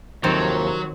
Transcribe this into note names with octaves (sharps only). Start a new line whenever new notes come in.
D#2 C3 D#3 F3 F#3 C4 A4 A#4